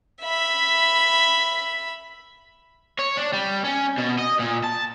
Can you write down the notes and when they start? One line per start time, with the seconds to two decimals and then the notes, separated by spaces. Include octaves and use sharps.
0.23 E5 B5
2.99 C#5
3.17 D4
3.33 G3
3.65 C#4
3.98 B2
4.19 D#5
4.39 A#2
4.64 A5